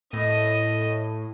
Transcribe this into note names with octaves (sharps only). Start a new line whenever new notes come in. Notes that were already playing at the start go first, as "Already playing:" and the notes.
A2 D#5